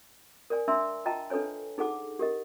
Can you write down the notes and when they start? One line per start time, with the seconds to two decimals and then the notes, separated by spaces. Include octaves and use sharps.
0.50 A#4 D5 G#5
0.68 D4 E5 G#5 A#5 C6 E6
1.06 F4 D#5 G5 A5 A#5
1.30 D4 A4 B4 C#5 G#5
1.78 D#4 G#4 A4 F#5 D6
2.19 G4 A#4 D#5